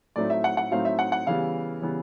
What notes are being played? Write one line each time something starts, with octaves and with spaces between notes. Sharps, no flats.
A2 F#3 A3 C4 D#4 D5
E5
F#5
F#5
A2 F#3 A3 C4 D#4 F5
E5
F#5
F#5
C#3 E3 G3 B3 F5
C#3 E3 G3 B3